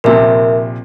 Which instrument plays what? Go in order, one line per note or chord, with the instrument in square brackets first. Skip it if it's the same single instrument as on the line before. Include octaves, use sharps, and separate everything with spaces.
[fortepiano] A#1 C3 [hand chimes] A#4 E5